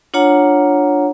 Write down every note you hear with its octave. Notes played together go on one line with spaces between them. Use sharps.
D4 F4 C#5 F#5 A#5